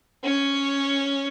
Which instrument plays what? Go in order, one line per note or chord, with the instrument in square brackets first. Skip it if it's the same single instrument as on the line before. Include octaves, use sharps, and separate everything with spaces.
[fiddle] C#4 C#5